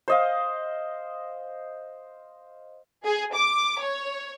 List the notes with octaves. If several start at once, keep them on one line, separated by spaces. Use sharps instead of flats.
C5 D#5 F5
G#4
D6
C#5